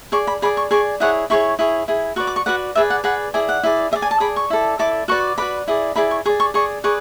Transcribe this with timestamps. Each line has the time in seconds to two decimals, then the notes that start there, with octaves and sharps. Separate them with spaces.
0.12 G#4 D5 C#6
0.27 B5
0.42 G#4 D5 B5
0.57 C#6
0.71 G#4 D5 C#6
1.00 E4 G#4 C#5 F#5
1.30 E4 G#4 C#5 C#6
1.59 E4 G#4 C#5
1.88 E4 G#4
2.16 F#4 B4 D5 C#6
2.27 D6
2.36 C#6
2.46 F#4 B4 D5 F#5
2.75 G#4 B4 D5 E5
2.90 F#5
3.04 G#4 B4 D5 F#5
3.34 E4 G#4 D5 G#5
3.49 F#5
3.63 E4 G#4 D5
3.91 G#4 E5
3.96 D5
4.02 G#5
4.11 A5
4.20 G#4 D5 B5
4.36 C#6
4.50 E4 A4 D5
4.79 E4 A4 D5 D6
5.08 F#4 B4 D5 C#6
5.38 F#4 B4 D5 B5
5.68 E4 G#4 D5
5.96 E4 G#4 D5 B5
6.11 C#6
6.26 G#4 C#6
6.29 D5
6.40 C#6
6.54 G#4 D5 C#6
6.84 G#4 B4 D5 C#6